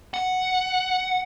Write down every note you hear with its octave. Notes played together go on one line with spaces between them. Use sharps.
F#5